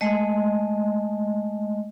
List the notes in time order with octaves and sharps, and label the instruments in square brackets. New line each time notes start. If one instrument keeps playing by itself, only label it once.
[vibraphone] G#3 A3 D#5